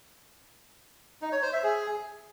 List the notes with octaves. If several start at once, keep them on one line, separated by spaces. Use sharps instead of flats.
D#4
C#5
C5
E5
G#4